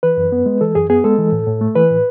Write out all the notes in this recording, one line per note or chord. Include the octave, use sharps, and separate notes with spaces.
E3 B4
F#2
B3
G#3
E3 A4
F#2 G#4
B3 G#4
G#3 A4
E3
A2
A2
A3
E3 B4
A2